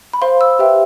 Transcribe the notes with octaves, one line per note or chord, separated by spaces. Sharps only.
B5
C5 F5 C6
E6
G4 B4 E5 G5